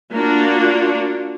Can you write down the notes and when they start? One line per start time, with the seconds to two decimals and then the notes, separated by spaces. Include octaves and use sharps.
0.12 A#3 D4 F4 F#4